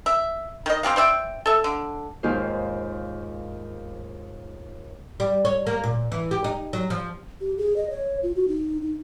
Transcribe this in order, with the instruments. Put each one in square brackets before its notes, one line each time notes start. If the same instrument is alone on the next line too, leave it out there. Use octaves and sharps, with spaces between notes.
[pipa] E5
D#3 D#5
C4 D4 G4 F5
C5 D5 E5 G5
A4 E5
D3
[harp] D#2 G#2 D#4 F4 C5
[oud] G3
C#5
A#3
A#2
E3
G4
D#4
F#3
F3
[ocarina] G4
G#4
D#5
C#5
F4
F#4
D#4
D#4